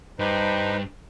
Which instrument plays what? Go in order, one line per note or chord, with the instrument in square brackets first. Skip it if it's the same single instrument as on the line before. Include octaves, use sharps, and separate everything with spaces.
[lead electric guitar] G2 [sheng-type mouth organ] D#4 B4 C5